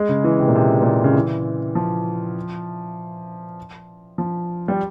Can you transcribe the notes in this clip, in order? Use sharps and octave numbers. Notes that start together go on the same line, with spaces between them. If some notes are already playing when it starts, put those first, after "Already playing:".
Already playing: G#3
C#3
E3
C3
A#2
C3
A#2
C3
C#3
E3
F3
F3
G3